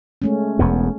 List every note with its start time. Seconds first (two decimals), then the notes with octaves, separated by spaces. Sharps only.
0.22 G#3 A3 C#4
0.59 E1 E2 B3